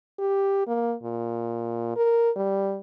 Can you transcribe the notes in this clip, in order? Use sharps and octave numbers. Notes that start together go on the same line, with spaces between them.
G4
A#3
A#2
A#4
G3